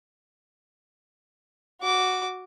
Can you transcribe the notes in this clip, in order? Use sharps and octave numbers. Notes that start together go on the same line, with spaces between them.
F#4 D6